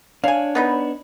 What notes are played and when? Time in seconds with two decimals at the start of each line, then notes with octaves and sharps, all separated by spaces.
0.24 D4 C#5 F5 G#5
0.55 B3 D#4 B4